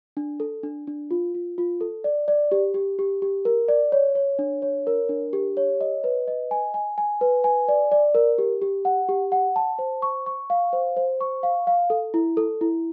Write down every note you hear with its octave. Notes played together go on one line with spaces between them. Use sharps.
D4
A4
D4
D4
F4
F4
F4
A4
D5
D5
G4
G4
G4
G4
A#4
D5
C#5
C#5
D4
C#5
A#4
D4
G4
C#5
D#5
B4
D#5
G#5
G#5
G#5
B4
G#5
D5
D5
A#4
G4
G4
F#5
G4
F#5
A5
C5
C#6
C#6
F5
C5
C5
C#6
F5
F5
A4
E4
A4
E4